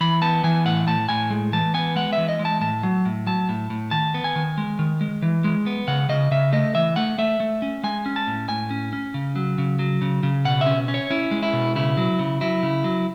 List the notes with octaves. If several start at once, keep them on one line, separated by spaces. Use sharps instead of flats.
E3 B5
B3 A5
E3 G#5
A2 F#5
A2 A5
A2 G#5
G#3
E3 A5
B3 G#5
G#3 F#5
E3 E5
D#5
G#3
A5
A2 A5
F#3
A2
F#3 A5
A2
A2
D#3 A5
B3
G#5
D#3
G#3
D#3
G#3
E3
G#3
B3
C#3 F#5
C#3 D#5
C#3 E5
A3 D#5
E3 E5
A3 F#5
A3 E5
A3
C#4
G#3 G#5
C#4
A5
A2
A2 G#5
C#4
C#4
C#3
F#3
C#3
F#3
C#3
C#3
B2 F#5
C#4 E5
C#4
C#5
C#4 E4
G#3
E4
B2
C#3 E4
F#3
C#3
F#3 E4
C#3
F#3